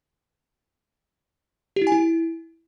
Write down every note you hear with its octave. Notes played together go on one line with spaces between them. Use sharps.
G4
E4
G#5
E4